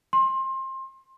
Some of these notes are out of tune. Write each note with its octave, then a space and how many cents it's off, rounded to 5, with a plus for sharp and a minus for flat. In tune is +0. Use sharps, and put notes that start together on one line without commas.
C6 +25